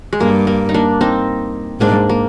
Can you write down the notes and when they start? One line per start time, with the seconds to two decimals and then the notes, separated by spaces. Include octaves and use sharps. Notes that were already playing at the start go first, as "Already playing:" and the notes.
0.13 G#3
0.20 G2 A#3
0.47 A#3
0.69 D#4
0.74 A#3 D4
1.01 C4 D#4
1.80 G#2 A#3 D4
2.09 A#3